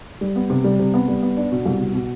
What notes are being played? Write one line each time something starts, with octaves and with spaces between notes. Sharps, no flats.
G3
B3
C3
G3
C3
B3
G3
B3
D4
B2
C2
B2
B2